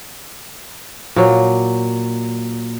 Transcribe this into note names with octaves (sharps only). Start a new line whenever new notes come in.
A#2 F#3